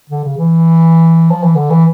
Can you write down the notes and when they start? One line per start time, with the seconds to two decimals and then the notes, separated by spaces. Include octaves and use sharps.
0.10 D3
0.24 C#3
0.38 E3
1.31 F3
1.43 E3
1.56 D3
1.70 E3